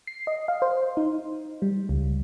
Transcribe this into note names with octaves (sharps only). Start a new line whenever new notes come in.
C7
D#5
F5
C5
D#4
G3
C#2